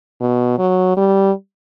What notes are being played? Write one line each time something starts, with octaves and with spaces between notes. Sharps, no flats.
B2
F#3
G3